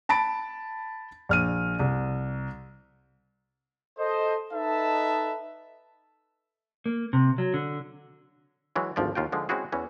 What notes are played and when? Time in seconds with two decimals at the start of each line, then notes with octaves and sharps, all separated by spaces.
0.09 A5 B5 A6 D7
1.29 A#1 F6 D#7
1.79 C2
3.98 A4 C5 D#5
4.52 D#4 A4 B4 D#5 E5 A5
6.86 A#3
7.13 C3
7.38 F#3
7.54 D3
8.76 E3 F#3 G#3
8.96 G#1 D2 F3 E4 D5
9.15 D#2 F4 F#4 G5
9.32 D3 F3 G#3
9.49 G#3 C4 C#4 E4 F#4 G#4
9.72 E2 E3 C#4